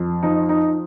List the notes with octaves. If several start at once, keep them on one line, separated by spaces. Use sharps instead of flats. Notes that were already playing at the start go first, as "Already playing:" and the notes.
Already playing: F2
F3 D#4
D#4